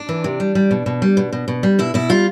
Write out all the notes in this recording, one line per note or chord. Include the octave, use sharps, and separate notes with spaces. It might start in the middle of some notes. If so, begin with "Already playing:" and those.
Already playing: D4
E3
C3
G3
G3
B2
B2
G3
B2
B2
B2
G3
B2 E4
B2 E4
G3 F4